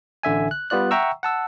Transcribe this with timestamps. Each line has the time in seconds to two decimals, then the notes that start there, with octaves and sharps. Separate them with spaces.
0.23 A1 D3 E5 G#5
0.51 F#6
0.70 G3 B3 F4 D5 F#6
0.91 E5 F#5 G5 A#5 C#6 E6
1.23 F#5 A5 E6